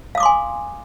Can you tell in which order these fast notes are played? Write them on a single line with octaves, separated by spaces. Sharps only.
F5 D#6 D6 C6 G#5